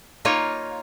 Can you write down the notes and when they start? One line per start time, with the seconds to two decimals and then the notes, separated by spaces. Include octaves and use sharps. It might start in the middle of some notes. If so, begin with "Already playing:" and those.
0.25 A#3 D#4 F4 C#5